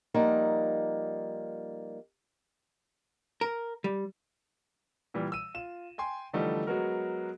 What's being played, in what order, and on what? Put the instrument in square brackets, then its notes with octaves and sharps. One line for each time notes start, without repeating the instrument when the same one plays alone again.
[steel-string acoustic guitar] F3 G3 A#3 D#4 F#5
[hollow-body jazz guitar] A#4
G3
[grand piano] A#2 E3 G3
E6 D#7
F4 E7
G5 G#5 C6
D3 E3 F3 G3 A3 D#4
F#3 G#3 B3 F#4 A#4